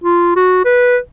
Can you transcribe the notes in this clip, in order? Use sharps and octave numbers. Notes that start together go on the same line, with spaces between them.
F4
F#4
B4